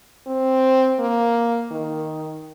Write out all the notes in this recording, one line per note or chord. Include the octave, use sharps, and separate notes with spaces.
C4
A#3
D#3